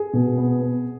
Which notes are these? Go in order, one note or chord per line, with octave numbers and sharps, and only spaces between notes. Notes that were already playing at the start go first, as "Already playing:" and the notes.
Already playing: G#4
B2
B3
B3